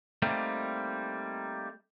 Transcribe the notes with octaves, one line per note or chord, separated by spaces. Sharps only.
G3 A3 A#3 C4 D#4